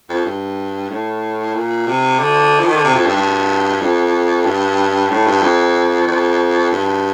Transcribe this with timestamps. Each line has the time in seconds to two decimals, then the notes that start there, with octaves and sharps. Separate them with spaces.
0.09 F2
0.26 G2
0.90 A2
1.55 A#2
1.87 C3
2.19 D3
2.60 F3
2.67 D#3
2.76 D3
2.84 C3
2.94 F2
3.06 G2
3.16 G2
3.82 F2
4.46 G2
5.10 A2
5.26 G2
5.42 F2
6.07 F2
6.72 G2